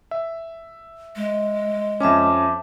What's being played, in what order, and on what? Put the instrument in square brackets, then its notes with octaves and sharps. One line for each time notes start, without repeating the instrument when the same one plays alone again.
[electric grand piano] E5
[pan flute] G#3
[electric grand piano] F2 C#4 [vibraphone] E5 A5 D6